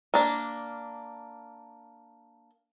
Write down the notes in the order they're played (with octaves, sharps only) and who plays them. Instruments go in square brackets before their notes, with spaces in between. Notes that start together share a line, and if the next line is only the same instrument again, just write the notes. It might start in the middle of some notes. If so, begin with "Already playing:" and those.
[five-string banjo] A#3 D4